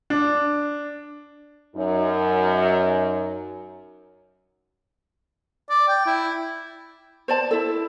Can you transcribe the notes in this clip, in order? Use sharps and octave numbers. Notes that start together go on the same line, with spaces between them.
D4
F#2 D#4
D5
G5
E4
C5 D5 A5
E4 A4